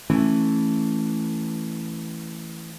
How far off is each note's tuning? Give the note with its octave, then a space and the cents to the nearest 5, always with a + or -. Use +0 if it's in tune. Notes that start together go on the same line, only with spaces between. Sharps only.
E3 +0 A3 +0 C#4 -15